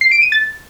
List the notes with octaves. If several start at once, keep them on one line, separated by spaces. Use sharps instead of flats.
C7
D7
D#7
A6